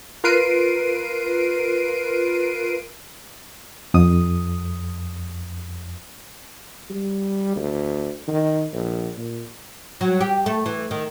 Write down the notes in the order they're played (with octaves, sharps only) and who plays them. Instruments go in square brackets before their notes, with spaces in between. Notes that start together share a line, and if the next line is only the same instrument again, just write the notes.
[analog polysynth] F4 A#4 B4 C7 D7 D#7
[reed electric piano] F2 D#6
[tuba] G3
D2
D#3
A#1
A#2
[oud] F#3
G4
A3
E3
D#3